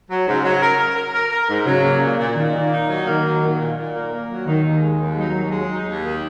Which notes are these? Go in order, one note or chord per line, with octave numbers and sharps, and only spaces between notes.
F#3
G#2 C#3
F#3
A#4
A#4
A#4
A#4
A#4
G#2
C#3 F#3
A#3
A#2
A#2
A#2 D#3
A#3
D#4
F#3
D#3 A#3
F#3
A#2
A#2
A#2
A#3
A#3
F#3
D#3 D#4
D#2
G#3
D#2
F#3 D#4
D#2
G#3
D#4
D#2
D#3